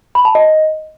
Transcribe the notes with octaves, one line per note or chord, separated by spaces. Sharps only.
B5
A5
D#5